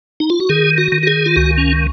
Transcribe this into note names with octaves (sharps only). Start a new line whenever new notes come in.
D#4
F4
F#4
D#3 G#4
F#4
D#3
F#4
G#4
F4
C#2 F#4
C#4